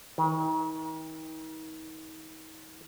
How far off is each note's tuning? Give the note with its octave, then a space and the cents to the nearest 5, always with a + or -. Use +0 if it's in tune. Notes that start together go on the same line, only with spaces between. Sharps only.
D#3 +35